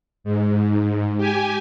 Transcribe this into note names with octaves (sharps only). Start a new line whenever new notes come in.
G#2
G4 G#5